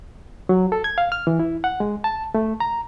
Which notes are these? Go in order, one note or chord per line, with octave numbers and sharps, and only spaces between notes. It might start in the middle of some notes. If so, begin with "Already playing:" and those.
F#3
A4
G#6
F5
F6
E3
E4
F#5
G#3
A5
A3
A#5